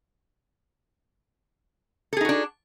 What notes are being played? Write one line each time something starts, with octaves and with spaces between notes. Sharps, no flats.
D4 D#4 F#4 G#4 A4